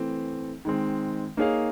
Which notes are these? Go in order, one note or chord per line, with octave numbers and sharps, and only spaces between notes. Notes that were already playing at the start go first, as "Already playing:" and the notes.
Already playing: E3 A3 C4
D#3 G#3 C4
A#3 D#4 G#4 C#5 F5